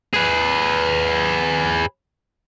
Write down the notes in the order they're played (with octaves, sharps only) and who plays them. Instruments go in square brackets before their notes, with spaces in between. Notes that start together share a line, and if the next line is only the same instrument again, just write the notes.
[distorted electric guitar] G#4 B4